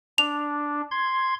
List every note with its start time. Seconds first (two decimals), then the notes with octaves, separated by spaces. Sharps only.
0.18 D4 F7
0.91 C6 G#6